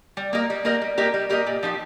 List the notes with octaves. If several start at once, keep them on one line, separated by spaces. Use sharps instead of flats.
G3
A#3 G4 A#4 D#5
G3
A#3 G4 A#4 D#5
G3
A#3 G4 A#4 D#5
G3
A#3 G4 A#4 D#5
A#2
F3 D#4 G4